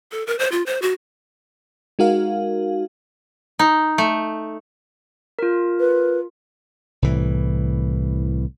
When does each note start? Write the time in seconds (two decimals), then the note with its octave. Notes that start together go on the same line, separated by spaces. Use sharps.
0.12 A4
0.27 A#4
0.39 C5
0.52 F4
0.66 C5
0.82 F#4
1.99 G#3 D#4 F#4 A#4 F5
3.59 D#4
3.98 A3
5.39 F4 A#4
5.80 B4
7.02 C2 A2 E3